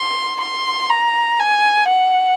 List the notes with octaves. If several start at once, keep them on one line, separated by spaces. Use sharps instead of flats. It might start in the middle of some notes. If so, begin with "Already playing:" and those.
Already playing: C6
C6
A#5
G#5
F#5